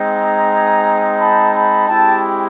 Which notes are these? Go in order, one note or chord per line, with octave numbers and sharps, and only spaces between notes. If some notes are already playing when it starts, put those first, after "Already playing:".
Already playing: G#3 C4 D#4
G#5 A#5
A5 B5
A5 B5
G#3 C4 E4 G4 G5 A5